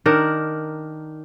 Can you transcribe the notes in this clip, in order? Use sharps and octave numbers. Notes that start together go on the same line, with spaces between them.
D#3 D4 A#4